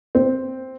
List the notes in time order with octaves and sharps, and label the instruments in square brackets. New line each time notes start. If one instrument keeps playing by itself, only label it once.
[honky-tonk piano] C4